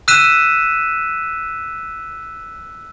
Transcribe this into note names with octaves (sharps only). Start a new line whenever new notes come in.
E6 F#6 B6 D#7 E7